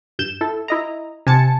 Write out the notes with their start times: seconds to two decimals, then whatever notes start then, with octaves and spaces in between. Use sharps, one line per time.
0.19 G2 G6 E7
0.41 E4 A4
0.68 E4 D#5 A#5
1.27 C3 G#5 A5 C#7